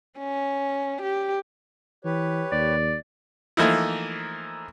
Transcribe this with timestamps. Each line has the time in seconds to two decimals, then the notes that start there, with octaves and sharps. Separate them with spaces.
0.19 C#4
1.02 G4
2.05 E3 G4 B4 C#5
2.52 D#2 D5
3.57 E3 F3 A3 A#3 D#4 E4